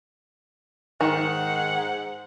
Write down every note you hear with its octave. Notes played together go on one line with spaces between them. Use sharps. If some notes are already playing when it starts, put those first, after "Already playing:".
G#2 D#3 F#5